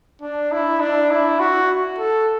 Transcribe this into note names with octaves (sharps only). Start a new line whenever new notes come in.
D4
E4
D4
E4
F#4
A4